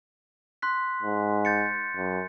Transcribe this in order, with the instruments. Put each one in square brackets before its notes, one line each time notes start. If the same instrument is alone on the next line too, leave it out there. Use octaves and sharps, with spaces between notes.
[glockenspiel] C6 F#6 B6
[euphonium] G#2
[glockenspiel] G6 A6 C#7
[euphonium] F#2